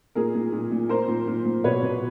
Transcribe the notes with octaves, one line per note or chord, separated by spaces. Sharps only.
A#2 G#4 A#4
A#2
A#2
A#2
A#2 A#4 C5
A#2
A#2
A#2
B2 B4 C#5
B2